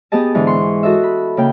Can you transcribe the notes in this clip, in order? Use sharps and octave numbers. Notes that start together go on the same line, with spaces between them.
B3 G4 G#4 D#5 A5
G#2 D3 E3 G#3
C6 C#6
F#4 A4 D#5 E5
B5
C#3 A#3 G5